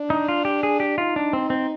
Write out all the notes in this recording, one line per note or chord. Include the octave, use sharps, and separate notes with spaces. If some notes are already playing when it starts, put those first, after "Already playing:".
Already playing: D4
D#4
F4
G4
G#4
G4
D#4 F4
D4
C4
C4